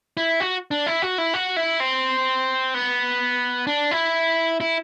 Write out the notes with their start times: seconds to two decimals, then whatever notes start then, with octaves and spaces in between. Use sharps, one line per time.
0.17 E4
0.40 F#4
0.71 D4
0.86 E4
1.02 F#4
1.18 E4
1.34 F#4
1.57 E4
1.80 C4
2.74 B3
3.67 D4
3.91 E4
4.61 E4